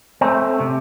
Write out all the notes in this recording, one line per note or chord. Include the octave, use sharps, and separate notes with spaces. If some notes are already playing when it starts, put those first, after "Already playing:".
A3 C4
C3